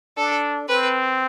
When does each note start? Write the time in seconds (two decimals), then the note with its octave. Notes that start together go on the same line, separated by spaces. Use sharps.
0.17 D4 A4
0.69 C4 B4